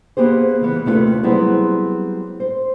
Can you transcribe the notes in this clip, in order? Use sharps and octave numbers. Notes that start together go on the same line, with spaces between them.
A#3 B3 G4 G#4 C5
C#3 E3 B3
D#2 C3 A3 E4 F4 B4
F#3 G3 B3 C4 E4 G#4
C5